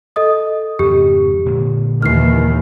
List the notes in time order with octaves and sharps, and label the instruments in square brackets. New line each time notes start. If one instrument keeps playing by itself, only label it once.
[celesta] A4 D#5 D#6
[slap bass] F2 G#2 C#3 [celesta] G4
[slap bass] A#2 D3 G#3
[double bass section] D#2 D#3 E3 [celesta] F6 C7